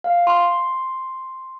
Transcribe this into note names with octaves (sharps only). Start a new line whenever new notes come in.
F5
C6